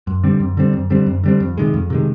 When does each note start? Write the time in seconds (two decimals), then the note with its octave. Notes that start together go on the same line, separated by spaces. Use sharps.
0.07 F#2
0.24 D3 G3 C4
0.40 F#2
0.57 D3 G3 C4
0.73 F#2
0.90 D3 G3 C4
1.07 F#2
1.24 D3 G3 C4
1.40 F2
1.58 C3 D#3 G#3
1.74 F2
1.90 C3 D#3 G#3